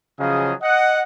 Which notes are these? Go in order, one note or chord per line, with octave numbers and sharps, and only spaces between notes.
C#3 F3 F#3 G#4 D#5 F5
D#5 F#5